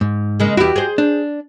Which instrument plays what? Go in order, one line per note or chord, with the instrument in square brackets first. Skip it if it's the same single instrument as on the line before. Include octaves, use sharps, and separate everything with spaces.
[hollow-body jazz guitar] G#2
[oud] C#3 G#3 A#3
[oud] E2 E4 [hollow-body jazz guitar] F#4 G4
[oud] G#4 C5
[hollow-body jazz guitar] D4